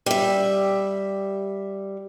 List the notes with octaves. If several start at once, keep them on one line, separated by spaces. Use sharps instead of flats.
G3 E5